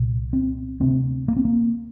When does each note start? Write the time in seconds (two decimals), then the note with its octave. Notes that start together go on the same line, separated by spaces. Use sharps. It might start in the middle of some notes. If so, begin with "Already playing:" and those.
Already playing: C2 A#2
0.33 C4
0.80 D2 C3 C4
1.28 A#3
1.36 C4
1.45 A#3